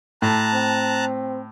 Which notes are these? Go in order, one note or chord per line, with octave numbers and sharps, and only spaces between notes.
A2 A5 A#5 F#6
C4